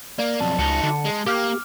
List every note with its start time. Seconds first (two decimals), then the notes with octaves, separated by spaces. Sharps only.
0.19 A#3 D5
0.41 B1 F2 A5
0.59 C#2 D#4 F#4 A5 C#7
0.83 D3
1.05 G#3
1.26 A#3 G4 D6 F6